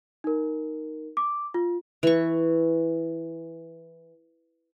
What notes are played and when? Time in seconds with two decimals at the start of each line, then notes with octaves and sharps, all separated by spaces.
0.24 D#4 A#4
1.17 D6
1.54 F4
2.03 E3 C#6